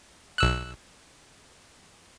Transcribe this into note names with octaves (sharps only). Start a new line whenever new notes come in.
B1 E6 F#6